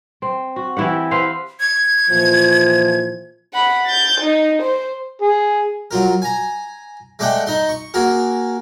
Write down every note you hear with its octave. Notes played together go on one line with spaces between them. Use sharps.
C4
F#4
E3 E4 G4 F#5
B4 C5 F5 F#5
G#6
A#2 E3 F3
F#5 B5
G6 A6
D#4
C5
G#4
F#3 F4 A#4
G#5 A#5
G#3 A3 D5 F#5 G5
D#4 D#5 C6
C#6
A#3 F#4 G#4 A#4